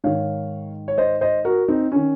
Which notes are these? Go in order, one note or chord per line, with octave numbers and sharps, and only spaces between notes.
G#2 D#3 C#5 F5
C#5
C5 D#5
C5 D#5
F#4 A#4
C4 D#4
D#3 C#4